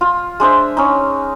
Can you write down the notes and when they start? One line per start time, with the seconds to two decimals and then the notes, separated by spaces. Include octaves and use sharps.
0.01 F4
0.40 G#3 D4 C5 E5
0.77 C#4 D#4